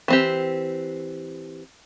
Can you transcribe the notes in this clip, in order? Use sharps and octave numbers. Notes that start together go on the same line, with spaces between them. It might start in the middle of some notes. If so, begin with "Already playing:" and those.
E3 C4 G4